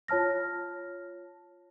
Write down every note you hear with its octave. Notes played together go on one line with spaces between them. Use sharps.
F4 C#5 A5 F6 A#6